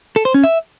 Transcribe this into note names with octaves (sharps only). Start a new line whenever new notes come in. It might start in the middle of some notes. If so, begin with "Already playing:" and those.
A4
C5
C#4
E5